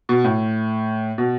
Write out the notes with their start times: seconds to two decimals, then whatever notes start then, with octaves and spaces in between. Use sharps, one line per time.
0.09 B2
0.24 A2
1.18 B2